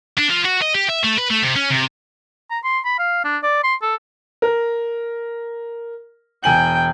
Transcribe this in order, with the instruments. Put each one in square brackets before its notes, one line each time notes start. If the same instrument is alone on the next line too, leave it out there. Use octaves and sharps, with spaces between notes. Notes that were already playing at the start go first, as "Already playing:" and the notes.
[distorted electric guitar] D4
F3
F#4
D#5
G4
E5
A3
B4
A3
C3
C#4
C3
[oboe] A#5
C6
B5
F5
D4
D5
C6
A4
[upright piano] A#4
[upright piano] E1 G#5 F#7 [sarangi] G5